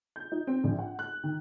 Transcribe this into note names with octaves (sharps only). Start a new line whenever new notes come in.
G6
D#4
C4
A#1
F#5
F#6
D#3